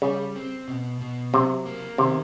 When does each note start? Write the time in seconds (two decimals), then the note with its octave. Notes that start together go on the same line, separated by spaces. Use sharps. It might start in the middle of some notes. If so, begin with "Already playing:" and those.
0.02 C#3 G3
0.36 C4
0.68 B2
1.01 B2
1.33 C3 F#3
1.66 A#3
1.98 C3 D#3